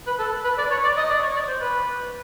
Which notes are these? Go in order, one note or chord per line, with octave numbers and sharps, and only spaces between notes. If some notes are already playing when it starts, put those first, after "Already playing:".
B4
A4
B4
D5
C#5
D5
D#5
D5
C#5
D5
C5
B4